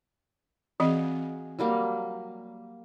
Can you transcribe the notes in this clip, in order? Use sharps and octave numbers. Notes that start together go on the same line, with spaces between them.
E3 C4 F#4 G#4 D#5 F5
F#3 G3 A#3